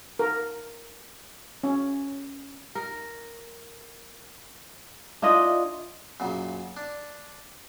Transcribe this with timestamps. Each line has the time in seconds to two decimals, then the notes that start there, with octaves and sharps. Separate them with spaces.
0.19 A#4
1.63 C#4
2.75 A#4
5.22 D4 E4 F4 D#5
6.20 F#2 A#2 C#3
6.76 D4